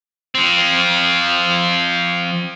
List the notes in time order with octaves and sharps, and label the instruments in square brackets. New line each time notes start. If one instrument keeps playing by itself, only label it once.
[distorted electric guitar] F3 C4